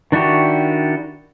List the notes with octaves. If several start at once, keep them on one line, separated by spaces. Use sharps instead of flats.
D#3 D4 E4 F#4 G4